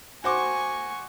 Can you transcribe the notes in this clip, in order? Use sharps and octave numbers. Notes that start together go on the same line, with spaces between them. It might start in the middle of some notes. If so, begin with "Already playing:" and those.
F#4 C5 G#5 C#6 D6